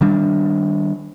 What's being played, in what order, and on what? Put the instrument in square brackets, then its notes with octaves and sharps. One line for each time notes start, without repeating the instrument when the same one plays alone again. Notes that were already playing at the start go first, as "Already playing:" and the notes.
[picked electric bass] D#3 G3 D4